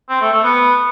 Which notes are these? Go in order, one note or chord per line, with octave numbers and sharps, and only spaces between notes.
C4
A3
A3
B3